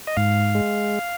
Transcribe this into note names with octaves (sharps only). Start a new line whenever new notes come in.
D#5
G#2 F5
G#3